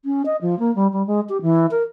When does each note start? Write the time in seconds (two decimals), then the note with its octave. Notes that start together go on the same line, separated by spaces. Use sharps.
0.05 C#4
0.26 D#5
0.41 F3
0.59 A#3
0.75 G3
0.93 G3
1.07 G#3
1.29 G4
1.42 E3
1.71 A#4